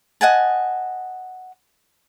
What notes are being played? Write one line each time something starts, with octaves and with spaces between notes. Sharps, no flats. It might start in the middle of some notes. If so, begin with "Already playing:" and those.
D#5 F#5 G#5 A5